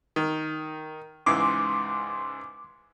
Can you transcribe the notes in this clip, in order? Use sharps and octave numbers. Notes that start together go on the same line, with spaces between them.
D#3
C#2 G#2 E3 C6 D6